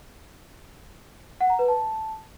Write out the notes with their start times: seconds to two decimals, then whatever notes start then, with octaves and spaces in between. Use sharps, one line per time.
1.41 F#5
1.50 A#5
1.59 B4
1.68 A5